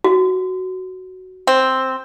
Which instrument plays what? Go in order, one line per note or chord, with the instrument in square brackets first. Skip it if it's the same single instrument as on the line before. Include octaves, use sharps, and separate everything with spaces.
[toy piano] F#4
[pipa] C4